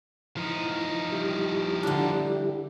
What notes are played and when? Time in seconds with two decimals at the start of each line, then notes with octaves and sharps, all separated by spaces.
0.37 E3 F3 D#4
1.12 G3 E4 G4
1.83 D3 D4